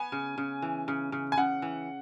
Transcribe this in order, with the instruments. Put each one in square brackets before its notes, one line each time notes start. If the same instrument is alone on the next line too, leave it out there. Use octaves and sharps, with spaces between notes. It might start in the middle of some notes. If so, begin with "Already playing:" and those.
Already playing: [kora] B3 [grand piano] G#5
[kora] C#3
C#3
E3
C#3
C#3
[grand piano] G#5
[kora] C#3 [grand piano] F#5
[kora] E3